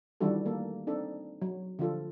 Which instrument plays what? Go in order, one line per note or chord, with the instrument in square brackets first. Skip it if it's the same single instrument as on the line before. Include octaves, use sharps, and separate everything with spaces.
[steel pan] D#3 E3 G3 D4 F#4 A4
A3 A#3 A4
C4 D4 D#4 A4
F#3
D3 F3 F4 A4